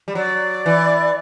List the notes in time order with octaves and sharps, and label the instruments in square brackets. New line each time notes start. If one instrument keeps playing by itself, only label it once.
[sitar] G3
[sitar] F#3 [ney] D5
[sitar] E3